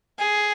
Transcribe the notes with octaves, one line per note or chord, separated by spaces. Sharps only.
G#4